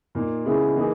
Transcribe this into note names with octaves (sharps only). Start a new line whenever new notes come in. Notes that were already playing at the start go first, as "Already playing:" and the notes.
A#2 A#3 D#4
C#3 G#3 B3 E4 G#4
E3 A#3 D#4 G#4